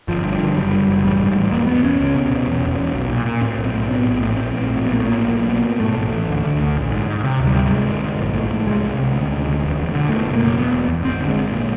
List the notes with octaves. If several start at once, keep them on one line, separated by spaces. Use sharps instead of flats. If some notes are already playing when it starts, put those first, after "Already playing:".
G1 F3
G2
D3
F#1 G3
F#1
F#1
A1 G3
G#2
A1
E1 A#3
E1 B3
E2 C#4
C#2
B2
B2
E2
E1
E1
B1
A#2
A#2
A2 C4
B1
C4
A2
A2 B3
A#1
A2
A#1 C4
A#1
A2
A#1 B3
A#3
A2 A3
A#3
A#1
B1
B2
B2
G#2 A3
A1
A1
D2
D2
D2
A#1
G#2
G#2
C3
D2
G3
C3
G3
G1 G#3
G1
G1
A#1
A2
A2
C2 G#3
C2
C3
D2
D2
D2
E1
E1
D3
B2 A3
F#1
A#3
F#1
E1 B3
E1
E2
G#1 C4
D3
G#3
G#1
A#2